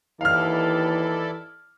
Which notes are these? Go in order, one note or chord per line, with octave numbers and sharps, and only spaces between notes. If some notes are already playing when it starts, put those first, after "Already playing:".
D#2 E3 E4 A4 D5 F5 F6